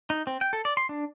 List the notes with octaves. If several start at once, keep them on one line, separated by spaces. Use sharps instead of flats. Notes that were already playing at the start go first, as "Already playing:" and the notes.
D#4
C4
G5
A4
D5
C6
D4